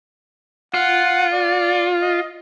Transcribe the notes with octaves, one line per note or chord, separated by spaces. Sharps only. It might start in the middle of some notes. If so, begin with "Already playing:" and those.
F4 F#5
D5
D#5